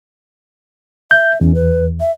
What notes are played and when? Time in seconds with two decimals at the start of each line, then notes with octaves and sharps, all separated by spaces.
1.11 E5 G6
1.41 E2 C#4
1.55 B4
2.00 E5